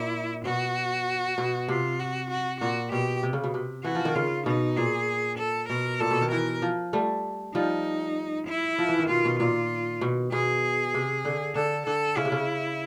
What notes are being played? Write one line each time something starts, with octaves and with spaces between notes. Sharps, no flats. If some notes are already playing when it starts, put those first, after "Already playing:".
Already playing: A#2 E4
B2 F#4
B2
C3 F4
F#4
F#4
A#2 F#4
B2 G4
C3
C#3
B2
C3
E3 F#4
F3
D#3
C#3 F4
B2 D#4
A#2 G#4
A4
B2 A#4
A#2 A4
B2
D#3
E3 A#4
F3
G3 A3
F3 G3 D#4
E4
F3
E3
D#3
B2 F4
B2
A#2 F4
B2
B2 G#4
C3
D3
D3 A4
D3 A4
C#3 E4
C3
C#3